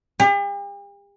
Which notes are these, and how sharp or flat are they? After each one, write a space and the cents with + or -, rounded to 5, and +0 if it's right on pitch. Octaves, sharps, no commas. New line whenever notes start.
G4 +45